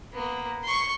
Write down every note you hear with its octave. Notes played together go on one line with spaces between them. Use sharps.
A#3 B3
C6 C#6